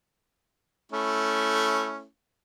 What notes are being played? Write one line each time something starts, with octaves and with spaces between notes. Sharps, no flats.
A3 C#4 E4